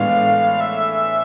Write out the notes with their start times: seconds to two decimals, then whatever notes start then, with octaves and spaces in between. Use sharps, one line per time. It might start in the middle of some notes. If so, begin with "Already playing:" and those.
Already playing: A2 E3 G#3 B3 D4 F5
0.60 E5